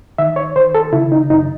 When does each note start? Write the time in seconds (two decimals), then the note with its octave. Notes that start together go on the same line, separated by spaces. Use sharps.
0.18 D#3 E5
0.36 C#5
0.56 D#3 C5
0.75 A4
0.93 C#3 E4
1.12 D#4
1.30 F#2 D#4